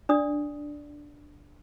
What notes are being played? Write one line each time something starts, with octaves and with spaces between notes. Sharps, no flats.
D4 D5 D#6